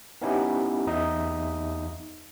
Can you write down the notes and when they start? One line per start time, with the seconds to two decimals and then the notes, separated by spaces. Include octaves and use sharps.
0.22 B3 C#4 D#4 E4 G4
0.87 E2 D#4 D#5 E5 D#6